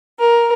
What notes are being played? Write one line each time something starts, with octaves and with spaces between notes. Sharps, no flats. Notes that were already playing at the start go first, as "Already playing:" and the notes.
A#4